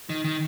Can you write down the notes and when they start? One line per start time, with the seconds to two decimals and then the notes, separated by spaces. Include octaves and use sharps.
0.09 D#3
0.24 D#3